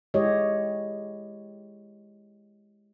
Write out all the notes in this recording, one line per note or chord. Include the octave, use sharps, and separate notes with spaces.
G#3 E4 G4 C#5 D#5